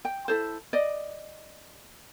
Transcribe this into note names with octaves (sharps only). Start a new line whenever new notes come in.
G5
E4 A4 C5
D5 D#5